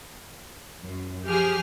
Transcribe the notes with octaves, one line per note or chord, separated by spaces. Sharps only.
F#2
F3 G4 G#4 F6 C7